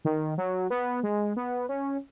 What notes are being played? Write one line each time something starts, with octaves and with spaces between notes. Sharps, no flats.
D#3
F#3
B3
G#3
B3
C#4